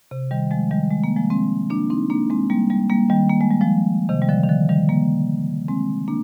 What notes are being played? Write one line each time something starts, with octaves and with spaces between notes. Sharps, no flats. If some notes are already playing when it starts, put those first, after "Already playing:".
C3
D#3 G3
F3 G#3
D#3 G3
G#3
A#3
F3 G#3
G#3 C4
A#3 D4
C4 D#4
A#3 D4
G#3 C4
G3 A#3
G3 A#3
G3 A#3
D#3 G3
A#3
G#3
G3
F3 G#3
C3 D#3
G3
D3 F3
D#3
D3 F3
D#3 G3
G3 A#3
G#3 C4
A#3 D4